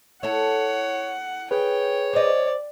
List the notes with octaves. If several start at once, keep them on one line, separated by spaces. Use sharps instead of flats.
E4 A4 C#5 F#5
G#4 B4 C#5 G5
C5 D5 D#5